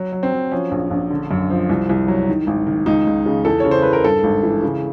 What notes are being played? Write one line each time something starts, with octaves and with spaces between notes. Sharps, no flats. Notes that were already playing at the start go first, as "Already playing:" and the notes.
Already playing: F#3
F#3
C4
F#3
F3 C#4
A#1
A#1
D3
F#2
F3
C2
C2
F#3
D#3
G#1
D#3
C#2 D#4
C#2
C#3
E2 A4
C#3 C#5
C5
E2 B4
A#4
G2 A4
G#1
E3
C#3